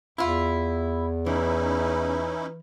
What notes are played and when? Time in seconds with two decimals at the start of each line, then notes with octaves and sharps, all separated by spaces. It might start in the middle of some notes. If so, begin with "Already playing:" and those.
0.18 E2 E4 F4
1.26 E3 C#4 D#4 E4 B4